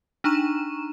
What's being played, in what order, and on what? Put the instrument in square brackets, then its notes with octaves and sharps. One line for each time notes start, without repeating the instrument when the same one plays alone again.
[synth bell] D4 D#4 A#5 C#6 D#7 E7